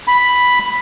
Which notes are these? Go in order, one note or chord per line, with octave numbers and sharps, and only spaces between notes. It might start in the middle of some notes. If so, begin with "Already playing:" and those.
B5